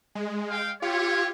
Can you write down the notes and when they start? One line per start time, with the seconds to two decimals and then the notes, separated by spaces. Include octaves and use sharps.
0.15 G#3
0.50 F5 G5
0.82 E4 F4 G4 C#5